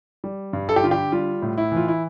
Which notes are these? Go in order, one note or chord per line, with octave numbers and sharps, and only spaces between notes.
G3
G2
A4
G4
D3 F4
G4
G3 F4
A2
E4
E3 F4
E4